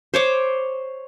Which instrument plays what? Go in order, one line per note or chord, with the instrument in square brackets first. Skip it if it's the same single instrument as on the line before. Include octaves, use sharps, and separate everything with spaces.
[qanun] C5 C#5 D6